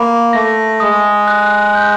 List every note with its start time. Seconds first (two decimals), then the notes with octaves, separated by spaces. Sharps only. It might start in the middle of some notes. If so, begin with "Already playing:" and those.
Already playing: A#3 B5
0.33 A3 A#6
0.80 G#3 D#6
1.28 F#6
1.75 G6